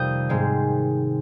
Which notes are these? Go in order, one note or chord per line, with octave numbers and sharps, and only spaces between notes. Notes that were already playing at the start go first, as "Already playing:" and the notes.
Already playing: F2 C3 D#3 G3 D#6 G6
G#2 D#3 G#3 C4